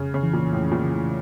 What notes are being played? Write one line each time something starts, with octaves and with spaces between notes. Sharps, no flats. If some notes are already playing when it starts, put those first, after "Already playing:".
Already playing: F2 C#3
C#3
E3
A#2
F2 A2
A#2
C#3
A2